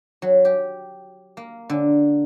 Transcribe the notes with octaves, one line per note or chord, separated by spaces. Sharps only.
F#3
G4
A#3
D3